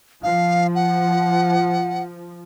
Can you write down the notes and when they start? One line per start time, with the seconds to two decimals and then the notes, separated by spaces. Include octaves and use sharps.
0.23 F3 F5
0.75 F#5